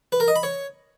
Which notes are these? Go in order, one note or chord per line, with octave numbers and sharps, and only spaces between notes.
B4
A#4
D#5
B5
C#5